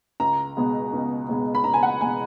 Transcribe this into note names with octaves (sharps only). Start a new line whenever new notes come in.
C#2 A#5
B2 G#3 B3
C#2
B2 G#3 B3
B5
C#2 A#5
G#5
F#5
B2 G#3 B3 G#5